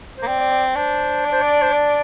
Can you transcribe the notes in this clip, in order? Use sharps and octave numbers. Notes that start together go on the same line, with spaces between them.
A#3 C5
C4 D5
D5
D5
D4 C5
D5
C5
D5
C5
D5